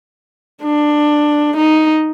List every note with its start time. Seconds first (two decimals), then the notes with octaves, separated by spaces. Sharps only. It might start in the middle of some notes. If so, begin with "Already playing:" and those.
0.63 D4
1.57 D#4